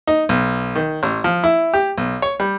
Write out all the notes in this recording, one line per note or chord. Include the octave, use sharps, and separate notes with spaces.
D#4
B1
D#3
A1
F3
E4
G4
B1
C#5
G3